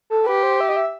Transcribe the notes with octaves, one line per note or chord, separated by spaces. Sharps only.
A4
G4 B4
C5
E5
D#5
E5